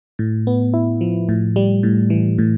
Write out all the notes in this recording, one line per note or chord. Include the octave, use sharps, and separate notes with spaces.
A2
B3
E4
F3
A2
G3
A2
E3
A2